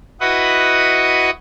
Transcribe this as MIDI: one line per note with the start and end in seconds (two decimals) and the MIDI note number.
0.21 1.30 64
0.21 1.30 66
0.21 1.30 71
0.21 1.30 75
0.21 1.30 78
0.21 1.30 87